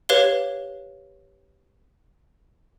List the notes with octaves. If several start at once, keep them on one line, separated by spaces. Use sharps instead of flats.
G4 B4 C#5 F5 G7